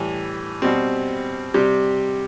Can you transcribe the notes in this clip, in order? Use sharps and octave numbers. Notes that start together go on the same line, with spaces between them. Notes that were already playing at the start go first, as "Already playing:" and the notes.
Already playing: A2 E3 G3
B2 G3 C4
C3 G3